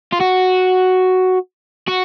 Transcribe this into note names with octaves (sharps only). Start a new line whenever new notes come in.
F4
F#4
F#4